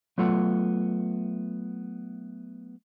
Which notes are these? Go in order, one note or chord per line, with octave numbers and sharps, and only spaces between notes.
F#3 A3 B3 F4 A4 F#5